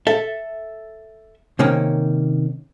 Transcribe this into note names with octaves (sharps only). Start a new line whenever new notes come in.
A4 E5
C3 D#3 A#3 C#4